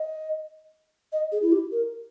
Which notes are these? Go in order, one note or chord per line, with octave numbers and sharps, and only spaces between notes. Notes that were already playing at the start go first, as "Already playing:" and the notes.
Already playing: D#5
D#5
G#4
E4
G4
A#4